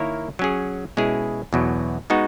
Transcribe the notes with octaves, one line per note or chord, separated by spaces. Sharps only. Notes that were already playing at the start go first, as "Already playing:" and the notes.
Already playing: D#3 A#3 E4 A#4 C#5
F#3 C#4 G#4
B2 G#3 C#4 E4 G#4
E2 B2 F#3
G#3 B3 D#4 F#4